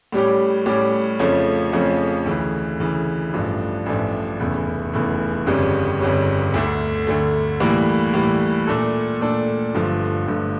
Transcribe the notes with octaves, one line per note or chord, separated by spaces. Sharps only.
A2 G3 C#4 G4
A2 G3 C#4 G4
F2 C#3 F3 A3 C#4
F2 C#3 F3 A3 C#4
D2 C#3 E3
D2 C#3 E3
A1 G2 F3 A3 D4
A1 G2 F3 A3 D4
F1 E2 C#3 E3 A3
F1 E2 C#3 E3 A3
G1 F2 C#3 G3 C#4
G1 F2 C#3 G3 C#4
D2 D3 A3
D2 D3 A3
A2 E3 G3 A#3
A2 E3 G3 A#3
A#2 A3 D4 A4
A#2 A3 D4 A4
G1 G2 F3 A3
G1 G2 F3 A3